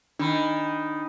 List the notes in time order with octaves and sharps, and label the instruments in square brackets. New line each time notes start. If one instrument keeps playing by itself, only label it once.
[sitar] D#3 [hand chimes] D4 B5